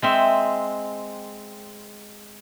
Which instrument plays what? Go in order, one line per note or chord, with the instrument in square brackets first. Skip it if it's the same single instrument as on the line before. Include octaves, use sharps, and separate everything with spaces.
[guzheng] G#3 C4 E5